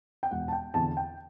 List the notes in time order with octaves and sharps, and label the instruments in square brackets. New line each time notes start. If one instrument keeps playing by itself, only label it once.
[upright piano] G5
E1 F#5
A5
G5
E2 D3 A5
G5